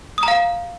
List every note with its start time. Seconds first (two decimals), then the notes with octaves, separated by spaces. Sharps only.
0.18 D#6
0.23 A#5
0.28 F5